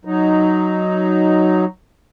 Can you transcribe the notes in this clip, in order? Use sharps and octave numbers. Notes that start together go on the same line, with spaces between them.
F#3 D#4